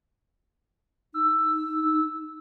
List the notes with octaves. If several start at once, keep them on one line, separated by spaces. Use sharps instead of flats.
D#4 E6